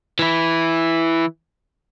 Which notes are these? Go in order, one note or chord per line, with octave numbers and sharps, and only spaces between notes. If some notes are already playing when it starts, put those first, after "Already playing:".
E3 E4